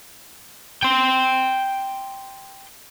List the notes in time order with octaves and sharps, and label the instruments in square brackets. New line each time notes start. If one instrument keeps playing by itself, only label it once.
[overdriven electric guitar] G5 C6